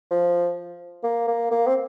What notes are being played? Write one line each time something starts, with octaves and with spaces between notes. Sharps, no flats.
F3
A#3
A#3
A#3
C4